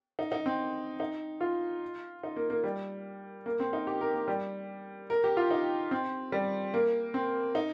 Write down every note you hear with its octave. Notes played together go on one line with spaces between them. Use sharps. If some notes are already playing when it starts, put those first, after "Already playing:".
D#4
D#4
C4
D#4
F4
D#4
A#3
A#3
G3
A#3
C4
D#4
G4
A#4
A#3
G3
A#4
G4
F4
D#4
C4
G3
A#3
C4
D#4